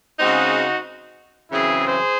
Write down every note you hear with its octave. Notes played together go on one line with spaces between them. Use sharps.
C#3 G#3 C4 D#4 F#4
F#2 C#3 E3 C4 E4 G#4
G#4 C5